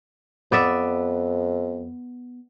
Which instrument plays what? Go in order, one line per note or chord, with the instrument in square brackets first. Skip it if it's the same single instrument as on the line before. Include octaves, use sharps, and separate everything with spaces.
[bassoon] F2 [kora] B3 D5 E5